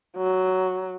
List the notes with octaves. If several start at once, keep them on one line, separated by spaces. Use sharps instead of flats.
F#3